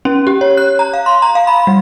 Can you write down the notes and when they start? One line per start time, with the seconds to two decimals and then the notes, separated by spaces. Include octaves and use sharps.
0.05 C#4
0.27 G4
0.41 C#5
0.57 F#6
0.79 A#5
0.93 F5
1.06 C6
1.22 A#5
1.35 F5
1.47 B5
1.67 G3